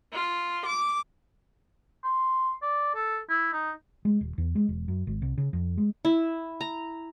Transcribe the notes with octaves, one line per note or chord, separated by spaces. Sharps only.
F4
D6
C6
D5
A4
E4
D#4
G#3
D#1
E2
G#3
E1
F#2
G#1
C2
C#3
F2
G#3
E4
A#5